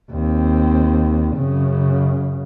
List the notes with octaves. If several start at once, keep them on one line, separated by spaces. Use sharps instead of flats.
D#2 C4
F#2 C#3